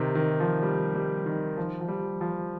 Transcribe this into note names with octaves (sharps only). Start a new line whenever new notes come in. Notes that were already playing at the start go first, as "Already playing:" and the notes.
Already playing: C3 D#3
D#3
F3
G3
G3
D#3
F3
F3
G3
F3